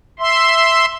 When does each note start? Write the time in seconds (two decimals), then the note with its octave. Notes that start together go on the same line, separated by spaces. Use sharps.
0.19 E5 C6